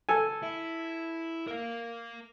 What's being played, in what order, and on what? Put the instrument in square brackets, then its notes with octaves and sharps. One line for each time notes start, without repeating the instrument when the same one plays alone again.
[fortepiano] A4 G#5
[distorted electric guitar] E4
A#4 F5